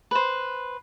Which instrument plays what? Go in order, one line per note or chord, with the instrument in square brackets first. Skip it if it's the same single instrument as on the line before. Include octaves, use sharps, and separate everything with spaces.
[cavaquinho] B4 C5